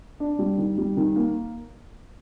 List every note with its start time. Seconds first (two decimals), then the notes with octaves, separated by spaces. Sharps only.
0.20 D4
0.39 G3
0.58 D#3
0.78 G3
0.97 D#3
1.16 A#3